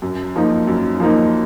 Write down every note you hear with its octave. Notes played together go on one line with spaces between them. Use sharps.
F#2
F3 A#3 D#4
F#2
F3 A#3 D#4